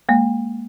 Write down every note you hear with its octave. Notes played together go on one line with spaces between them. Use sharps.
G#3 A#3